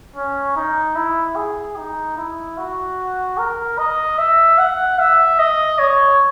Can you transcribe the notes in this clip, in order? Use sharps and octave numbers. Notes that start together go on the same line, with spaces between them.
C#4
D#4
E4
G#4
D#4
E4
F#4
A#4
D#5
E5
F#5
E5
D#5
C#5